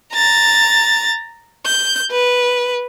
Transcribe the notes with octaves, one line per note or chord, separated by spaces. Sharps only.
A#5 A6
G6
B4